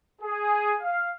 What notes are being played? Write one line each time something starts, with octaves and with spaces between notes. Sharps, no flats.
G#4
F5